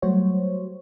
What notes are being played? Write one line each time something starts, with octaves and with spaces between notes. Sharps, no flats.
F#3 G3 A3 F#4 C5 C#5